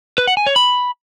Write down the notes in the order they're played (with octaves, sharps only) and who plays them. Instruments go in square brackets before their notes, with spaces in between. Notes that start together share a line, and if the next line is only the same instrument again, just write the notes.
[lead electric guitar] B4
F#5
G#5
C#5
B5